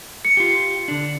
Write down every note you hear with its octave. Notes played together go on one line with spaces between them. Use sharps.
C#7
F4 G4
D3 D4